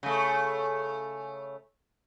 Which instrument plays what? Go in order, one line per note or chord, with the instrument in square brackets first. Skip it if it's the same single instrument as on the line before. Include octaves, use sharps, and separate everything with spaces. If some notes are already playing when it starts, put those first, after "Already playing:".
[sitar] C#3 A3